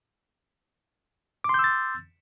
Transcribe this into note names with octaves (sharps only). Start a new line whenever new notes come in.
C6 D6 E6 G6 A6